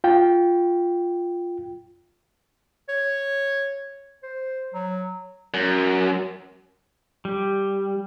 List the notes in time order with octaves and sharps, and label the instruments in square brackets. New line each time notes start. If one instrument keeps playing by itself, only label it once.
[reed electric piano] F4 G5
[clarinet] C#5
C5
F#3
[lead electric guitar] F#2
[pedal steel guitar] G3